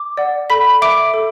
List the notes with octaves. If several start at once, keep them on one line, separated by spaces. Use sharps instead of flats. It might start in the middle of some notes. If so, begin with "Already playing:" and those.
Already playing: D6
D5 F#5
A4 B5 B6
E5 D6 D7
A4